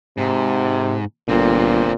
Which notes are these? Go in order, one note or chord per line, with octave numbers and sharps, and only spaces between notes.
G#2 C3
G1 A#2 D3 C4